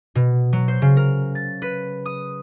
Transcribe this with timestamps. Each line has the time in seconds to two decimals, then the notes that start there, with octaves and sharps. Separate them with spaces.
0.15 B2
0.53 F#3
0.68 C5
0.82 C#3
0.97 A#4
1.35 A6
1.62 B4
2.06 D#6